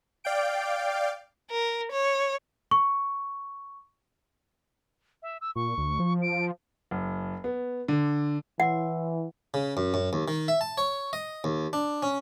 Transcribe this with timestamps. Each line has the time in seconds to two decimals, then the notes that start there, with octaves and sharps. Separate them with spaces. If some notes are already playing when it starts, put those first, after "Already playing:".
0.24 D5 F5 G5 D7
1.50 A#4
1.91 C#5
2.71 C#6
5.22 E5
5.41 E6
5.56 A#2 C#6
5.78 D2
6.00 F3
6.22 D7
6.91 F#1
7.44 B3
7.88 D3
8.60 E3 E4 C#5 F#5 C6
9.54 C#3
9.77 F#2
9.94 F#2
10.13 D#2
10.28 D#3
10.48 E5
10.61 A5
10.78 C#5
11.13 D#5
11.44 D#2
11.73 D4
12.03 C#4